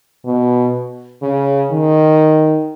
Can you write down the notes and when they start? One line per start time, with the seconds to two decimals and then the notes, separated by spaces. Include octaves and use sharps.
0.25 B2
1.22 C#3
1.71 D#3